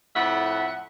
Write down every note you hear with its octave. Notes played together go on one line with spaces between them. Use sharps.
F2 A2 E5 F#5